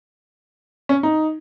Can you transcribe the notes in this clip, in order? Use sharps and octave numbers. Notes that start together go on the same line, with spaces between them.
C#4
D#4